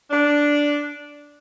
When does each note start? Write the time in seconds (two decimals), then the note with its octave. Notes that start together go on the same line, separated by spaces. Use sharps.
0.10 D4